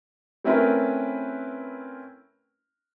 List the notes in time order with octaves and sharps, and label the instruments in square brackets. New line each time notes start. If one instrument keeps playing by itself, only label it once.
[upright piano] A3 C4 C#4 E4 A#4 B4